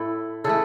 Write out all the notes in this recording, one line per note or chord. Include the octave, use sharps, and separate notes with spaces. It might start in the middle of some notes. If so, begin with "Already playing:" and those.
Already playing: A2 A3 E4 A4
C#3 E3 A3 A4